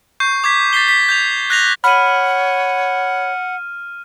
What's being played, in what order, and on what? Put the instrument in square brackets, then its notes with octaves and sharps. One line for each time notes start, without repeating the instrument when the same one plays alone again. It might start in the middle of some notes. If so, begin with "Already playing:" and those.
[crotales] C#6 G6 C7
D6 G#6 B6
A6 B6 C7 G7
B6
G6 G#6 F7
F#6 A#6 F7
[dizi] C#5 [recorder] F#5 [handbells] B5 [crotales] F6 D#7